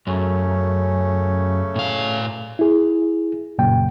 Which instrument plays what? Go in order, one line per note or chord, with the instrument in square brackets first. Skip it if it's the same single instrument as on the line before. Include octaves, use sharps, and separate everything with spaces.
[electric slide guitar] F#2 [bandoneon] C#3 A3 C#4
[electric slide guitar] A2 F5
[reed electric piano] E4 G#4
C2 F#2 A#2 C#3 G5